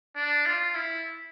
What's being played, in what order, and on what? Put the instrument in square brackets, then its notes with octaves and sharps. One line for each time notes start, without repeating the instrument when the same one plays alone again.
[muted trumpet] D4
F4
E4